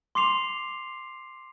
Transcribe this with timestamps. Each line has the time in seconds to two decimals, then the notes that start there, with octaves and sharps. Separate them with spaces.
0.15 C6 D6 C7 F7